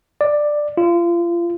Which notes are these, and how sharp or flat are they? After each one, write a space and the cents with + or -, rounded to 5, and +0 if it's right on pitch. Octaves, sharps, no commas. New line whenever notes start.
D5 +10
F4 -30